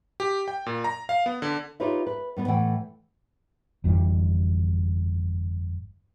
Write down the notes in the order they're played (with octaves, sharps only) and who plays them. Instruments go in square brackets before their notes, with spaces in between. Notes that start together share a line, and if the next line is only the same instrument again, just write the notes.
[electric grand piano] G4
G5
A#2
A#5
F5
B3
D3
[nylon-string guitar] D#4 F4 G4 B4 C#5 E5
B4
G2 B3 B4
A2 E3 A3 F#5 G5
[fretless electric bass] G1 F2 E3 G3